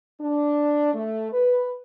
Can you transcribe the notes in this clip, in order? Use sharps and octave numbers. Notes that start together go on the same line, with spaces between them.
D4
A3
B4